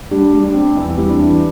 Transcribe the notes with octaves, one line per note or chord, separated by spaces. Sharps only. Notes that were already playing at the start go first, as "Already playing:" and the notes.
G3 D4 G4
G3
D4
C4
E2 E4
G3 E4
D4
E3